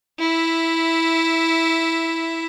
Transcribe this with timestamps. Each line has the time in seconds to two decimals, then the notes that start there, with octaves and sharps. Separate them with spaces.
0.19 E4 E5